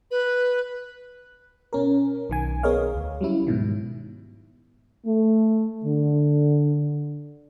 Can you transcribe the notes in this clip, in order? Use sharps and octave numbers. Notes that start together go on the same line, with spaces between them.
B4
B2 C#4 A#4
B1 D#3 G#5
B3 G#4 A#4 C#5 D#5 F5
D2
F#3 G3 C#4 E4
G#2 B2 D#3
A3
D3